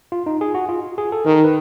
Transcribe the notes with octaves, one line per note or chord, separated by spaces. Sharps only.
F4
D#4
G#4
F#4
F4
G#4
A4
D#3 A#4
B4